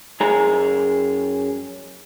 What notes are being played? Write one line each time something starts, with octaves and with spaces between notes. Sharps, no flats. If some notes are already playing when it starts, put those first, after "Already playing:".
F#2 G#4 A#5